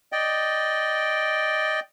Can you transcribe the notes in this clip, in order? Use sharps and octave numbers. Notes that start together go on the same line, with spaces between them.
D5 D#5 G5